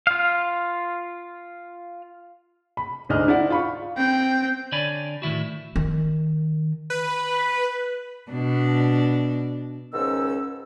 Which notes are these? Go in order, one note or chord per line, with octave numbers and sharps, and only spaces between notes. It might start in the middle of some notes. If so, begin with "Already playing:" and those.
F4 F5
B5
D2 G#2 D4 D#5 F6
D#4 E4 D5 F#5
F4 B5 C#6
C4 G5
D3 C#5 D5 G#5 B5
A2 D#3 E4 F#4
D#3
B4
B2 D4
C#2 G#2 D#3 C#4 E6